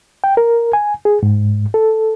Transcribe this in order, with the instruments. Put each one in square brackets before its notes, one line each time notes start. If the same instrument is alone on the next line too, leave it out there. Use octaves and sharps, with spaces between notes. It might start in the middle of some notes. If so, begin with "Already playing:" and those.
[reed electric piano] G5
A#4
G#5
G#4
G#2
A4